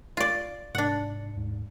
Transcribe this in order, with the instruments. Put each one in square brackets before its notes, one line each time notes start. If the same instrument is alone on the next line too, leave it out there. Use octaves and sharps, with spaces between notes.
[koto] F4 D5
[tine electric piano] G#2 C3 C#7 [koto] D4 F#5
[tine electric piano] D#2 G#2